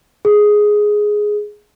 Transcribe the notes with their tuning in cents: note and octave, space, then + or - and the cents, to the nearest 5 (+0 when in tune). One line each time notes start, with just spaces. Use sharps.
G#4 +5